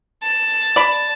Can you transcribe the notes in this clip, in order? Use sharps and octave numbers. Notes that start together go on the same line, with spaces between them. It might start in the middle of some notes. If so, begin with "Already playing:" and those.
A5
D5 B5